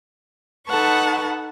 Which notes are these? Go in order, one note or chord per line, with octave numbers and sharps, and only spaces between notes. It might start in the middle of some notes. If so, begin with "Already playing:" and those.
D#4 A4 B4 F#5 A5 C#6